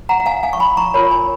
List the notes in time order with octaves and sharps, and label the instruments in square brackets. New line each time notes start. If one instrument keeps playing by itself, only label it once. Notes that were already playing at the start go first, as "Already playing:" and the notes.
[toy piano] F#5 A#5
F#5
F5 G#5
F5 G#5
C#6
G#5 B5
A#5 C#6
F4 A#4 C#5 G#5 B5
G#5 B5